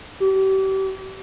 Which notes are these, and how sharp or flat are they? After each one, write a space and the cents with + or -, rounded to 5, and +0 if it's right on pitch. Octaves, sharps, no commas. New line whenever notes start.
G4 -35